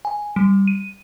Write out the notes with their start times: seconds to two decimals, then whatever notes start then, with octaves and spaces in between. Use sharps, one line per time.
0.05 G#5
0.36 G3
0.68 D#7